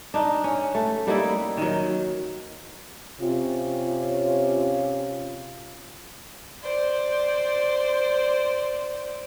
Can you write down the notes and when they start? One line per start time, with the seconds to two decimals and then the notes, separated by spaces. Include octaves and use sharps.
0.14 D4 D#4
0.44 C#4
0.75 A3
1.07 G3 A#3 D#4 E4
1.57 D#3 F#3
3.20 C3 C#4 F4
6.63 C5 D5